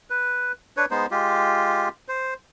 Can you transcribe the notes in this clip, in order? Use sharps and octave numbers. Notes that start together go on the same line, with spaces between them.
B4
D4 B4 C#5
G#3 B3 D#4 C5
G#3 F4 G4
C5